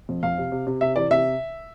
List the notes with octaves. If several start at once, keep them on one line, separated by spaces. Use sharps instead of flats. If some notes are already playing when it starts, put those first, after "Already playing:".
F2
F2 F5
C3
C3
C3
C3 E5
E3 D5
C3 E5